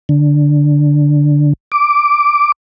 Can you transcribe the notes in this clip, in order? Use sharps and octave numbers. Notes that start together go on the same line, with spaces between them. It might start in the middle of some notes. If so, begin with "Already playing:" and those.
D3
D6